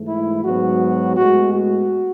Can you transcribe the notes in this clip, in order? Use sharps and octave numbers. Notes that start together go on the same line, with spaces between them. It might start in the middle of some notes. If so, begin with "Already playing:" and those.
Already playing: G#2 E3 A3
E4
G#2 F#3 B3 F#4
A2 G#3 B3 F#4
F#4